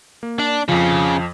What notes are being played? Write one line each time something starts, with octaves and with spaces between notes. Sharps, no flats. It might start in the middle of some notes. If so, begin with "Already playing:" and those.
A#3
D4
F2 C#3 F3